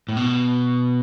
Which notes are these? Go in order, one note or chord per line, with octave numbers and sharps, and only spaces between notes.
A2
B2